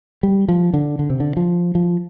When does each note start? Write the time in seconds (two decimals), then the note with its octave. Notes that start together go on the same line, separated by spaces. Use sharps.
0.23 G3
0.48 F3
0.74 D3
0.99 D3
1.10 C3
1.20 D3
1.37 F3
1.75 F3